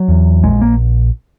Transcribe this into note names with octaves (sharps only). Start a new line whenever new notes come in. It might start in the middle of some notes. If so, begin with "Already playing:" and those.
Already playing: F#3
E2
A#1 G#3
A#3